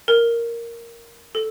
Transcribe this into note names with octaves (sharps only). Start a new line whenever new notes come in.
A#4
A4